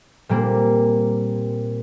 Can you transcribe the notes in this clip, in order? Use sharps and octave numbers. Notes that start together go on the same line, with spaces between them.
A#2 G3 A#3 C4